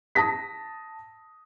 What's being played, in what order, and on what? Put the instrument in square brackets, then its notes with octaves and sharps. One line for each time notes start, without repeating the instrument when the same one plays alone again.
[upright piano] A5 D#6 A#6 B6